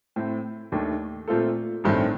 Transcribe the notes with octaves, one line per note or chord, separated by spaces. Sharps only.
A2 A3 C4
D#2 D#3 A3 D4
A#2 A3 C4 F4 A4
A1 G2 D#3 A3 C4